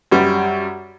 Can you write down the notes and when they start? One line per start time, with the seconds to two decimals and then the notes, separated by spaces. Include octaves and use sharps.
0.12 F#2 G3 D5